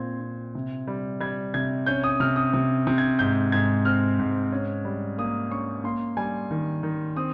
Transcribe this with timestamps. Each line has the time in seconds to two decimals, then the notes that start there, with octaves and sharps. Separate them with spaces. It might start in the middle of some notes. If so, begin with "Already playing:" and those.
Already playing: A#2 C4 G#6
0.21 C4
0.55 C3
0.87 G3
1.20 G3 G#6
1.54 C3 G#6
1.86 C#4 G6
2.04 D#6
2.20 C3 F6
2.36 D#6
2.54 C3
2.87 C3
2.98 G#6
3.19 G#2 G6
3.52 G#2 G#6
3.85 C4 F6
4.19 G#2
4.52 C#4
4.85 G3
5.18 A#3 D#6
5.51 C#4 C#6
5.84 A#3 C6
6.17 G3 G#5
6.51 D#3
6.83 D#3
7.17 C4 D#6